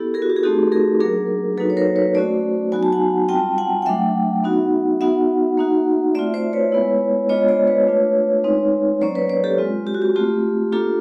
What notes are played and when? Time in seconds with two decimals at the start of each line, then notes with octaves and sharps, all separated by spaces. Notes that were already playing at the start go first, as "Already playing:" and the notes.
Already playing: B3 E4 G4 A4
0.14 G#4 A#4
0.22 F#4
0.30 G4
0.36 G#4
0.43 A3 C4 D#4 F#4 G4 A4
0.72 G#4 A#4
1.00 F#3 A#3 D4 G#4 A#4
1.57 F#3 A#3 D#4 F#4 A4 B4
1.70 C#5
1.77 A#4 C5
1.96 B4 C#5
2.14 A3 C#4 F#4 C5 D5
2.72 F#3 B3 D#4 F#4 G#5
2.83 A5
2.92 F#5 G#5
3.29 G3 C4 F4 G5 A5
3.58 F#5 G#5
3.82 G5
3.86 F#3 A3 D4 E5 F#5
4.44 B3 D#4 F#4
5.01 B3 D#4 F#4 E5 F#5
5.57 A#3 D#4 F#4
6.15 A3 C4 F4 D5 E5
6.34 C5 D5
6.53 B4 C#5
6.72 G#3 B3 E4
7.29 G#3 B3 D4 F4 C#5 D#5
7.48 C5 D5
7.67 B4 C#5
7.87 A3 D4 F4
8.44 G#3 C4 D#4
9.01 F#3 A#3 C#4 C5 D5
9.15 B4 C#5
9.29 C5 D5
9.44 G4 A4
9.58 G#3 C4 F4
9.87 G4
9.94 F#4
10.02 G4
10.16 A3 C4 F4 G4
10.72 A#3 D4 F4 G4 A4